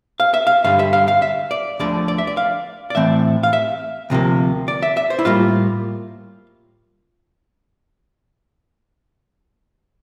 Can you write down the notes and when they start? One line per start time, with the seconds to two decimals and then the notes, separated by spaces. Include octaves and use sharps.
0.20 F5
0.34 E5
0.47 F5
0.64 G2 D3 G3 F5
0.79 E5
0.93 F5
1.08 F5
1.22 E5
1.51 D5
1.80 D2 D3 F3 A3 D5
2.08 D5
2.18 E5
2.27 D5
2.37 F5
2.90 D5
2.95 A2 E3 A3 C4 E5
3.43 F5
3.53 E5
4.10 D2 C3 F3 A#3
4.68 D5
4.82 E5
4.97 E5
5.10 C5
5.19 E4
5.25 A2 G3 A#3 F4